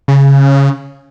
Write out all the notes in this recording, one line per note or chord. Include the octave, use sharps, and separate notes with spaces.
C#3